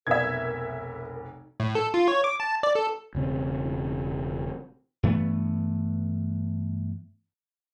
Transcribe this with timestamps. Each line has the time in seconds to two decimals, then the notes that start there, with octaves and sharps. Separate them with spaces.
0.07 F1 B1 B3 A#4 E5 G#6
1.60 A2
1.75 A4
1.94 F4
2.08 C#5
2.24 D6
2.40 A5
2.63 D5
2.75 A4
3.15 E1 C#3 C4
5.03 G2 E3 A3 B3